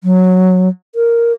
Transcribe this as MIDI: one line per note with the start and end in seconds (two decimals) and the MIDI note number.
0.04 0.68 54
0.95 1.33 70